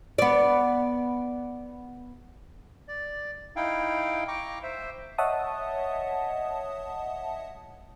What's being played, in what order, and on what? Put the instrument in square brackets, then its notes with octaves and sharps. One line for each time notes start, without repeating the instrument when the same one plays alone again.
[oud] B3 D5
[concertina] D5
D#4 E4 F5 G5
G5 A#5 C#6 D6
C5 E5
[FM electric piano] C#5 D#5 E5 F#5 A5 D#6